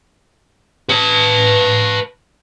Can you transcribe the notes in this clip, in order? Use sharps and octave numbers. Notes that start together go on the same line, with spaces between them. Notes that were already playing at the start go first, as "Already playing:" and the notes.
B4 A5